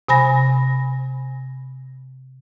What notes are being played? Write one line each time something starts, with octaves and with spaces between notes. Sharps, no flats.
C3 G#5 B5 A#6